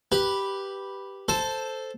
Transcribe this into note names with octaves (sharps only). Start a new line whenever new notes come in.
G4 B4
A4 C5